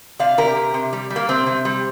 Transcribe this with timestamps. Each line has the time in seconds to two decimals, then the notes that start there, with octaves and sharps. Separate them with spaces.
0.19 C3 D5 F5
0.38 C3 G4 A#4
0.56 C3
0.74 C3
0.93 G3
1.10 G3
1.16 A#3
1.29 C3 C4
1.46 C3
1.65 G3